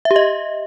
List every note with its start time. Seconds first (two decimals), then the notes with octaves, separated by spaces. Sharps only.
0.05 E5
0.11 G4
0.16 D#5